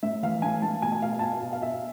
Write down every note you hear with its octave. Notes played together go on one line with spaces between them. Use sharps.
A2 E5
E3 F5
A2 G#5
A2 A5
B2 G#5
G#5
B2 F5
F5
A5
B2 G#5
F5
B2
F5
B2 E5